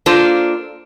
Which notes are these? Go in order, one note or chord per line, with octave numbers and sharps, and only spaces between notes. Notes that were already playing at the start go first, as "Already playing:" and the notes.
A#3 D4 F4 A4 C5